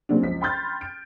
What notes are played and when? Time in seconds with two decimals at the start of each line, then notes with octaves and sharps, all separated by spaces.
0.09 A#2 C#3 F#3 A#3 C4 D4
0.22 C#2 F3 C5 B6
0.41 G5 B5 C6 F6 G6 A6
0.81 D7